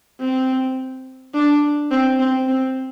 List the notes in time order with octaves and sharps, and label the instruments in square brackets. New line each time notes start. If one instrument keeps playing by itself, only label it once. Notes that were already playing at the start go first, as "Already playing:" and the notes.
[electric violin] C4
D4
C4
C4
C4